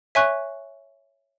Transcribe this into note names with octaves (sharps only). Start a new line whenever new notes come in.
C#5 E5 G#5 C#6 F#6